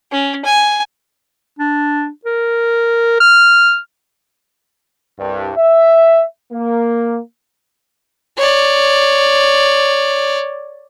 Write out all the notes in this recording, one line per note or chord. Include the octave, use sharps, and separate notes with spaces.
C#4
G#5
D4
A#4
F6
C2 G2
E5
A#3
C#5 D5